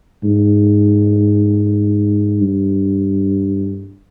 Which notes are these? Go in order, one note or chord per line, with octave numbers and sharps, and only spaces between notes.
G#2
G2